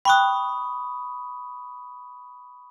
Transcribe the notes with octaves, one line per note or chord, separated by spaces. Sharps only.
G5 B5 C#6 D#6 F#6